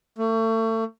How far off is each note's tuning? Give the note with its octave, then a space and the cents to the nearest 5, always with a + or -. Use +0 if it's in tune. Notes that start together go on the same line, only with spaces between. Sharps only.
A3 +35